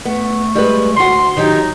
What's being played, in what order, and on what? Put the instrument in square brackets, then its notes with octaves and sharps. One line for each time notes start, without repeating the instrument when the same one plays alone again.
[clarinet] A3 [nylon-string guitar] B3
[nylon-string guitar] G3 G#3 B4
[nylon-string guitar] D2 F#4 [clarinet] C6
[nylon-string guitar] D#3 F#3 G4 [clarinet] D#4